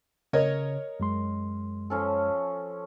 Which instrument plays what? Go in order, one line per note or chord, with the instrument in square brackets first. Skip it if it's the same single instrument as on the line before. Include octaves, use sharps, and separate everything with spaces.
[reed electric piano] C#3 [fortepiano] A#4 C#5 D#5
[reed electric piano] F#2 G#3 C6
[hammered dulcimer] F3 C#4 A4